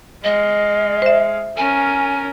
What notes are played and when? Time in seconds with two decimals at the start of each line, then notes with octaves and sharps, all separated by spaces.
0.24 G#3 D#5 F5
1.02 C5 E5
1.57 C#4 A#4 G#5